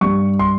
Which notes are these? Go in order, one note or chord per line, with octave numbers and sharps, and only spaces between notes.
G2 G3 C#6
C6